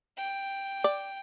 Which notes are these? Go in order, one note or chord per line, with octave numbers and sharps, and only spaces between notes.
G5
D5